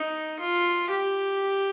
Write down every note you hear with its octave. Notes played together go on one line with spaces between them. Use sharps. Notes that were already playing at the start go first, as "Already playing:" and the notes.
Already playing: D#4
F4
G4